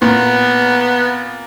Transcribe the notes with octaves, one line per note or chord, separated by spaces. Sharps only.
A#2 B3